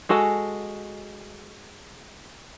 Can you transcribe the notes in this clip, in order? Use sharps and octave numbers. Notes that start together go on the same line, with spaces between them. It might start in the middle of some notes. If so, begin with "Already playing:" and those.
G#3 F#4 A4 G#5